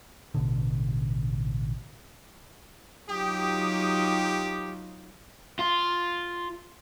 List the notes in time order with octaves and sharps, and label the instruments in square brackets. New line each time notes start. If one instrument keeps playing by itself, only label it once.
[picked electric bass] A1 B2 D3
[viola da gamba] F#3 D#4 F4 [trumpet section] G4 [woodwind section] G5 D#6
[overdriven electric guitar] F4